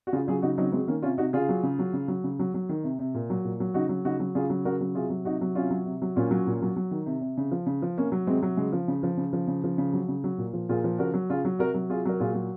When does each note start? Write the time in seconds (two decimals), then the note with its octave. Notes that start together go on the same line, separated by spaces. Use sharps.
0.07 F#4
0.13 C#3 F4 G#4
0.27 F#3 F4 G#4
0.42 C#3 D#4 F#4
0.58 F#3 C4 D#4
0.72 F#3 G#3 C4
0.88 D#3 A#3 C#4
1.02 C3 C#4 F4
1.18 C3 D#4 F#4
1.33 C#3 F4 G#4
1.49 F#3
1.63 C#3
1.79 F#3
1.93 C#3
2.08 F#3
2.24 C#3
2.39 F#3
2.54 F#3
2.69 D#3
2.84 C3
2.99 C3
3.15 A#2
3.30 F#3
3.45 A#2
3.60 F#3
3.74 C#3 D#4 F#4
3.89 F#3
4.05 C#3 D#4 F#4
4.20 F#3
4.35 C#3 F4 G#4
4.50 F#3
4.65 C#3 F#4 A#4
4.81 F#3
4.95 C3 F4 G#4
5.10 F#3
5.25 C3 D#4 F#4
5.41 F#3
5.55 C3 C#4 F4
5.71 F#3
5.86 C3
6.02 F#3
6.16 A#2 C#4 F4
6.31 F#3
6.47 A#2
6.62 F#3
6.76 F#3
6.91 D#3
7.06 C3
7.21 C3
7.38 C#3
7.52 F3
7.66 C#3
7.82 F3
7.97 C3 A#3 C#4
8.12 F#3
8.27 C3 G#3 C4
8.43 F#3
8.57 C#3 G#3
8.73 F3
8.88 C#3
9.03 F3
9.17 C#3
9.33 F3
9.48 C#3
9.64 F3
9.78 C#3
9.93 F#3
10.08 C#3
10.24 F#3
10.38 A#2
10.53 F3
10.69 A#2 F4 G#4
10.84 F3
10.99 C#3 F#4 A#4
11.14 F#3
11.30 C#3 F4 G#4
11.45 F#3
11.59 C3 F#4 A#4
11.74 F#3
11.89 C3 F4 G#4
12.05 F#3 A#4
12.20 A#2 F4 G#4
12.34 F#3